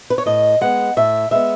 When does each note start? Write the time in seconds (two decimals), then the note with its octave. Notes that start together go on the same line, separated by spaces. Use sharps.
0.10 B4
0.18 C#5
0.26 A2 D#5
0.61 G#3 B3 F#5
0.97 A2 E5
1.31 G#3 B3 E5